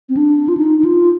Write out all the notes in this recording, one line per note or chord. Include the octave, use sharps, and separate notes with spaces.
C4
D4
F4
D#4
D#4
F4